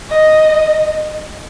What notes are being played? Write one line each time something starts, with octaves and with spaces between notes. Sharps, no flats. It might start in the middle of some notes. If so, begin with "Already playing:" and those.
D#5